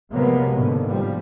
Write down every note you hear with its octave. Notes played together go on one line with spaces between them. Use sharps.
C3 F3 F#3 G#3 A#3 B3
G#2 B2 D3
F3 G3